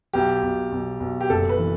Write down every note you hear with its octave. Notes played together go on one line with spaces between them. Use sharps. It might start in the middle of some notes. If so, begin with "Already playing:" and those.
B1 G4
B1
B1
B1
G4
F#1 A4
B4
E3